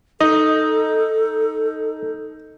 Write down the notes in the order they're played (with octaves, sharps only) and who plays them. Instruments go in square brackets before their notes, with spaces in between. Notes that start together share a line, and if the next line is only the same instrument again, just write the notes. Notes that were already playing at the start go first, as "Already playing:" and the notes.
[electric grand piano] D#4 [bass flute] A4 [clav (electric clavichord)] D#5